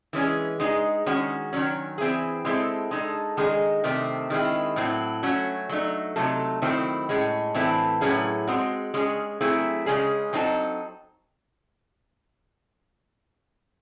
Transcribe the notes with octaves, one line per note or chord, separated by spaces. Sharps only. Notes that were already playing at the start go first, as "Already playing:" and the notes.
E3 G#3 C#4 G#4
G#3 D#4 G#4
D#3 G#3 C#4 F#4
D#3 F#3 C#4
E3 C4 E4 G#4
G#3 C4 E4 A4
G#3 D#4 A4
D#3 G#3 D#4 G#4
C3 D#3 A3 C4
D#3 G#3 C4 E4
A2 F#3 C4 E4
F#3 A3 C#4 F#4
F#3 A3 D#4
C3 F#3 A3 D#4 A4
D#3 F#3 A3 C4 E4
A2 G#3 C#4
A2 E3 C4 E4 A4
A2 F#3 C#4 E4 G#4
G#3 C4 F#4
G#3 C#4 G#4
F#3 A3 C4 E4 G#4
C#3 G#3 C#4 G#4
F#3 C4 D#4 F#4 A4